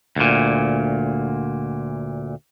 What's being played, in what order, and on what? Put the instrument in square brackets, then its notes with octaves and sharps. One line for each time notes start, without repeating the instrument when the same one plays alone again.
[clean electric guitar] D2 A#2